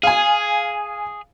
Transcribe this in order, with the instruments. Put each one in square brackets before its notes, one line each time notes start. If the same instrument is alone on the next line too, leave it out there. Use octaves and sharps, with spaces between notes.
[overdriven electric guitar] G#4 [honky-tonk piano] F5 G#5